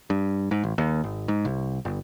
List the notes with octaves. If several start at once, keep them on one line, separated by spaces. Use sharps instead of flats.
G2
G#2
A1
D#2
G#1
G#2
C2
G1